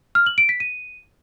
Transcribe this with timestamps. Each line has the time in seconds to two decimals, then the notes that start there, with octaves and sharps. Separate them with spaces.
0.15 F6
0.26 F#7
0.38 D7
0.49 B6
0.60 D#7